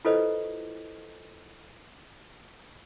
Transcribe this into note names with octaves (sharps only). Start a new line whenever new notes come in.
E4 F4 A4 B4 C5 D#5